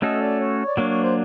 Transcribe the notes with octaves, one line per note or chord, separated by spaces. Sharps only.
A3 C#4 F#4 A4 D#5
D5
C#5
D5
F#3 A#3 D4 C#5
C#5
C5